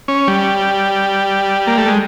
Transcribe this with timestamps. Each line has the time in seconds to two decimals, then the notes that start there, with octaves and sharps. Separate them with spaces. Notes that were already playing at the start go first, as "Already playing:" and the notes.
0.08 C#4
0.28 G3
1.67 A#3
1.78 A3
1.88 G#3